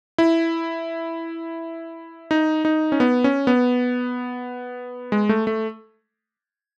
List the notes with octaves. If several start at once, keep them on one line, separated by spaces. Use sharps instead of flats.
E4
D#4
D#4
C#4
B3
C#4
B3
G#3
A3
A3